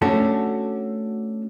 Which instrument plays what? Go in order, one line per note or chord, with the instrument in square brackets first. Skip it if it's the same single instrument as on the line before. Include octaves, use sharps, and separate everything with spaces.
[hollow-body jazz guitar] A3 C#4 D4 F#4 A4